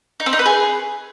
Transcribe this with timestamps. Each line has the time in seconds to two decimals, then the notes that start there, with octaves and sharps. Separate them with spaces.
0.20 D#4
0.26 C4
0.33 D#4
0.39 B4
0.46 G#4